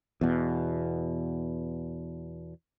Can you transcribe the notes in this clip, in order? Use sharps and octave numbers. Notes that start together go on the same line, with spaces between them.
E2 B2